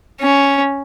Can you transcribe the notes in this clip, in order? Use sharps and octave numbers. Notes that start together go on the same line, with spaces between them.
C#4